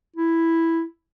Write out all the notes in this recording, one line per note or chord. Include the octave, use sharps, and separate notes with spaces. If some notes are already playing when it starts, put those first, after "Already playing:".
E4